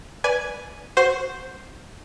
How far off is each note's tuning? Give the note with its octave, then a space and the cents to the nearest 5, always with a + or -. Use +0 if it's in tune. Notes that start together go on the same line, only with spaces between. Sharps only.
B4 +0 D5 -10 G#5 +0
F#4 +0 C5 +0